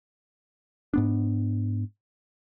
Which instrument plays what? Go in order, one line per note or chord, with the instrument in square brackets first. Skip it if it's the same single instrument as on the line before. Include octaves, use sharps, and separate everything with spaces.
[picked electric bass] G#2 B3 D4